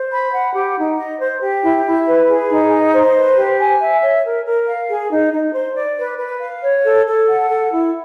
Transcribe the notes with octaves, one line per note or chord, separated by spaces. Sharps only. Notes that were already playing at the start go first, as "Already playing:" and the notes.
Already playing: C5
B5
F#5
G4
D#4
D#5
C5
G4
E4
E4
B4
G#4
D#4
D#5
C5
B4
G4
G#5
E5
C#5
A#4
A#4
F5
G#4
D#4
D#4
C5
D5
B4
B4
F5
C#5
A4
A4
F#5
A4
E4